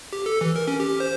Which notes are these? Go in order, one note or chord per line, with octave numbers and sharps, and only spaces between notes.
G4
A4
E3
A#4
C#4
G4
C5